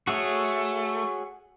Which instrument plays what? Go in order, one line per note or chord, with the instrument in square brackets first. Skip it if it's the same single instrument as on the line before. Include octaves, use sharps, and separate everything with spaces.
[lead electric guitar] A3 [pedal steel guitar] F#4 G#4 C#5